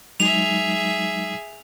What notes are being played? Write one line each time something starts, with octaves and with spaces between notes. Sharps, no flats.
F#3 G#3 D#4 G#4 E5 F7